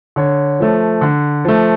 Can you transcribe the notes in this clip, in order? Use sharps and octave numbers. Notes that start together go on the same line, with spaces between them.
D3 C#5
F3 A3
D3
F3 A3